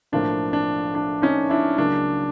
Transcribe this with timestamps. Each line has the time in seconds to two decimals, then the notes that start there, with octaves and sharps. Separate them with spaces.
0.12 B1 A2 F3 A#3 D4
0.53 D4
0.95 D4
1.22 C#4 D#4
1.50 D4 E4
1.78 C#2 C#3 F#3 A#3 D4